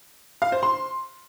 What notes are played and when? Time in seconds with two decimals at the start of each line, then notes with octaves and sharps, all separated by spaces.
0.42 F5
0.52 C5
0.63 C6